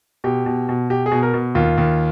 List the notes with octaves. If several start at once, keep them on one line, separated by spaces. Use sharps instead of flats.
B2 G4
B2
B2
B2 G4
G#4
B2
A#4
B2
D#2 F4
D#2